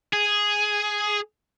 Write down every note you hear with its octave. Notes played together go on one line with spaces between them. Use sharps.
G#4